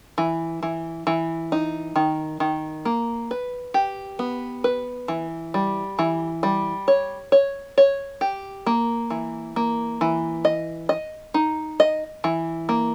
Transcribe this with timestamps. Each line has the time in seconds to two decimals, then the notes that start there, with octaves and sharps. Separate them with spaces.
0.18 E3
0.63 E3
1.07 E3
1.52 D#4
1.96 D#3
2.40 D#3
2.85 A#3
3.31 B4
3.74 G4
4.19 B3
4.64 B4
5.08 E3
5.54 G3
5.99 E3
6.43 G3
6.88 C#5
7.32 C#5
7.78 C#5
8.21 G4
8.66 A#3
9.10 E3
9.56 A#3
10.01 E3
10.45 D#5
10.89 D#5
11.34 D#4
11.80 D#5
12.24 E3
12.69 A#3